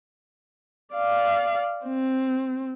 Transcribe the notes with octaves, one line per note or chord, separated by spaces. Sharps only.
D5 F5
C4